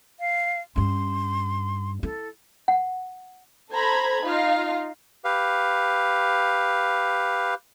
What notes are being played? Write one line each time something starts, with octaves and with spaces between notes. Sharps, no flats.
F5
G2 C#4 C6
E4 A4
F#5
A4 C5 A#5 B5 G#6
D#4 F4 F5
G4 B4 F5